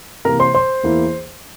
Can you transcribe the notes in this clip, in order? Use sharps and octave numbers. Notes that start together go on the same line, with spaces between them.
C3 E3 A#3 A#4 A#5
C5 C6
C5 C6
E2 E3 A#3 E4